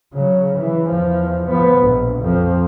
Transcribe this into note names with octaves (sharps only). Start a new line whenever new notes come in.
C#3 F#3
E3
E2 F3
F3 B3
A#1 B2
F2 F3